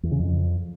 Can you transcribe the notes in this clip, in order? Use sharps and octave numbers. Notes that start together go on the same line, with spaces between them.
E2
C#3
F2